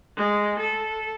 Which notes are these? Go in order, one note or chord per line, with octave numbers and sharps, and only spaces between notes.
G#3
A4